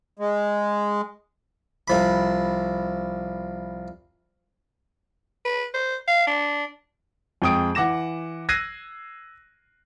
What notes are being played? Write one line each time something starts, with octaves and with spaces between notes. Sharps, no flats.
G#3
C2 F3 B5
B4
C5
F5
D4
F2 G#3 G5 D#6 D7
E3 F#5 D6 A#6 E7
E6 F#6 G#6 A#6 C7 D#7